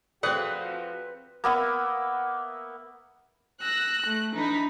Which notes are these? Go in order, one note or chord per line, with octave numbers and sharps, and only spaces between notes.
F3 C4 F#4 G#4 A4 B4 D5 F#5
A#3 B3 E5
E6 F#6 A#6
A3
E3 D4 D#4 B5